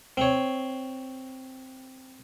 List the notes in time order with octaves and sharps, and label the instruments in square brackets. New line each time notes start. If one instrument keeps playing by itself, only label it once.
[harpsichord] C4 C#5